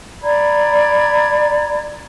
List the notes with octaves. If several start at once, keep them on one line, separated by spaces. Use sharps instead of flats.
D5 A#5 B5 G#6